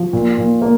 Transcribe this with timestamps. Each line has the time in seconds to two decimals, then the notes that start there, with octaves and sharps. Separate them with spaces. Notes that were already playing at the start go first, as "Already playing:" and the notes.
Already playing: F3
0.13 A#2
0.38 A#2
0.62 A#3